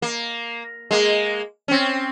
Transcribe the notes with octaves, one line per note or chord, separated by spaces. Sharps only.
A#3
G#3 A#3
C4 C#4